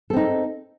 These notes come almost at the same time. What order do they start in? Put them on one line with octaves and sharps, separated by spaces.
A4 C4 D#4